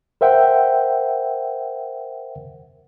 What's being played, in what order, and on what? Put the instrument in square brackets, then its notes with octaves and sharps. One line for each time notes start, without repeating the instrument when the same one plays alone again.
[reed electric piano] A#4 C5 E5 F#5 G5